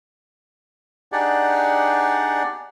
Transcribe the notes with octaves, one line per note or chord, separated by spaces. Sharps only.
D4 D#4 G4 G#4 D5 F#5